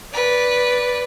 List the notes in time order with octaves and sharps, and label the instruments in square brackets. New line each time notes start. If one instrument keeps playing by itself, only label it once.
[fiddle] B4 D5